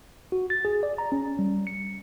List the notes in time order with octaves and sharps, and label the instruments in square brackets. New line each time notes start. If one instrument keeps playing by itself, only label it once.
[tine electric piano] F#4
A6
G#4
D5
A#5
C#4
G3
C#7